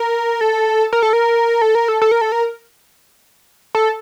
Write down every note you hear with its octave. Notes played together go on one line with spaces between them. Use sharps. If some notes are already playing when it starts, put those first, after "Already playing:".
Already playing: A#4
A4
A#4
A4
A#4
A4
A#4
A4
A4
A#4
A4
A#4
A4